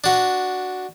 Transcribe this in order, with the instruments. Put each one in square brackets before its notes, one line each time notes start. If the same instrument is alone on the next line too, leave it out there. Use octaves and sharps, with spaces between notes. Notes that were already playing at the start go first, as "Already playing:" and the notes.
[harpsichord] D4 F#4